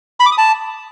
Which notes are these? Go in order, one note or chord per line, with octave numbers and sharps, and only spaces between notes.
B5
D6
D#6
A5